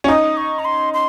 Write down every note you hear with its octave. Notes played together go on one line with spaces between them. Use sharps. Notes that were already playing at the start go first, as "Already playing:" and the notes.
C#4
D#4 D#6
C#6
A#5
C6
C6